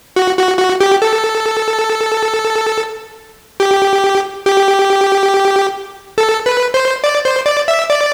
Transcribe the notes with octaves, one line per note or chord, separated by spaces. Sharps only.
F#4
F#4
F#4
G4
A4
G4
G4
A4
B4
C5
D5
C5
D5
E5
D5